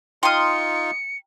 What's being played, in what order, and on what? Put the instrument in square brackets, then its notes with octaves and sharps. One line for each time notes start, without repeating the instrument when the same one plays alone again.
[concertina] D#4 F4 [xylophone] G5 A#5 F6 [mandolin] C6 D#6 [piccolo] C#7